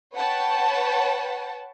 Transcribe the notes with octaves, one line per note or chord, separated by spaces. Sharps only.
B4 C#5 F#5 G5 A5